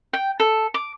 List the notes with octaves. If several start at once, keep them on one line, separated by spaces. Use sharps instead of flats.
G5
A4
D6